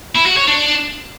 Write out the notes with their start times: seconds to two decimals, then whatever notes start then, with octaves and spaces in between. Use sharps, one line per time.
0.15 E4
0.26 F#4
0.37 C#5
0.48 D4